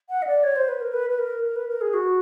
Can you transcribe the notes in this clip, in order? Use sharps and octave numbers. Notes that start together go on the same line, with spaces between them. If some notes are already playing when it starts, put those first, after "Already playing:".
F#5
D#5
D5
C#5
C5
B4
A#4
B4
B4
A#4
A#4
B4
A#4
G#4
F#4